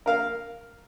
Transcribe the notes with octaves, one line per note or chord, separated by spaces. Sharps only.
A#4 F5